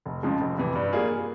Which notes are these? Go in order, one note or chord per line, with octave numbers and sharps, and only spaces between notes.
F1
F2 C#3 F3 G#3
F1
F2 C3 E3
G2
G3 A#3 F4 G#4